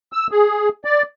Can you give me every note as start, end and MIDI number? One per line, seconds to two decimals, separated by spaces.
0.13 0.27 88
0.31 0.69 68
0.85 1.03 74